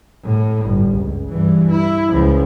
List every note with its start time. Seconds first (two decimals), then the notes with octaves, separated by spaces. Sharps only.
0.24 A2
0.66 G1
0.97 C#2
1.30 G2 E3
1.70 E4
2.12 C#2 F3